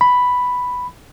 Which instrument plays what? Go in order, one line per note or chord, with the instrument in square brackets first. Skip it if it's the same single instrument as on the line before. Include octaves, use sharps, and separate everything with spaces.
[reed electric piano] B5